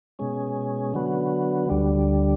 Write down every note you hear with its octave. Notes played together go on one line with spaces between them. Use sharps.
B2 G#3 C#4
D3 F#3 B3
D2 D3 G3